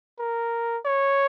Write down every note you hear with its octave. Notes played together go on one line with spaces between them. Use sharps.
A#4
C#5